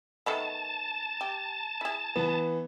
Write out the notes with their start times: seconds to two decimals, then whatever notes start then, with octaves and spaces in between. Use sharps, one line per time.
0.26 D#3 A3 B3 A5
1.21 G4
1.81 E4 G#4
2.16 E3 B3